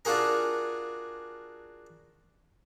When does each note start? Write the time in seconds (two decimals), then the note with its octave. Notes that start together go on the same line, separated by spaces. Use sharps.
0.05 D4 F4 F#4 G#4 A#4